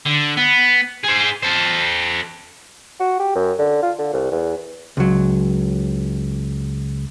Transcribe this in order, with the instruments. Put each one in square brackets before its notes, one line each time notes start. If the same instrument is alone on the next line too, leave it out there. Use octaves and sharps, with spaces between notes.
[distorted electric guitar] D3
B3
G#4 C5
A4 C5
[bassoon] F#4
G4
F#2
D3
F4
D3
C2
E2
[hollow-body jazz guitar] C#2 F#3